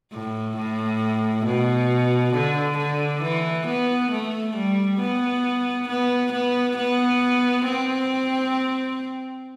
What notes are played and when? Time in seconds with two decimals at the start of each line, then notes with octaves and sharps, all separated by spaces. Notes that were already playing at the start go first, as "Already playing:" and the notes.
0.13 A2
0.57 A2
1.46 B2
2.34 D3
2.78 D3
3.22 E3
3.67 B3
4.12 A3
4.56 G3
5.00 B3
5.88 B3
6.32 B3
6.77 B3
7.65 C4